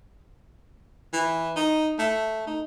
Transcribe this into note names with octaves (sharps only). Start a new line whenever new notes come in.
E3
D#4
A3
D#4